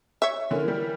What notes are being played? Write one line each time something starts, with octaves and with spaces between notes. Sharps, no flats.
C#5 E5
D3 C#4 E4 A#4
E3 G3